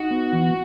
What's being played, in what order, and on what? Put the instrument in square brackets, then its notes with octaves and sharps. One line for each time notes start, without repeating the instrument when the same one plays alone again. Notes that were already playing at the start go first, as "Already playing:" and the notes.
Already playing: [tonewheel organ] D#4 [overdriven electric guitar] F#4
[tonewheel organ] B3
E3